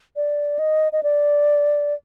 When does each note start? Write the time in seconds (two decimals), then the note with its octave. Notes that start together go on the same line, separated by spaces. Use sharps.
0.16 D5
0.59 D#5
0.92 D#5
1.03 D5